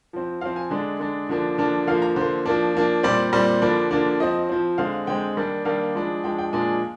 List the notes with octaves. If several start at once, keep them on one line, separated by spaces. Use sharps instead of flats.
F3 C4
F3 C4 F5
G#5
D3 G#3 D4
D3 G#3 D4
D3 F3 A#3 D4
D3 F3 A#3 D4
D3 F3 A#3 F5
A#5
D3 F3 A#3 C5
F3 A#3 D4
F3 A#3 D4
A#2 G3 C4 D5
A#2 G3 C4
D3 F3 A#3 D4
D3 F3 A#3 D4
F3 C4 D#5
F3 C4
D3 G#3 C4 F5
D3 G#3 C4 G5
D#3 G3 A#3 D4
D#3 G3 A#3 D4 F5
F3 G#3 D4
F3 G#3 D4 G5
G5
A#2 F3 G#3 D4 G#5